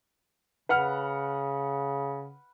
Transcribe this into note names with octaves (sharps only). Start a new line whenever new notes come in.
C#3 B4 F#5 F6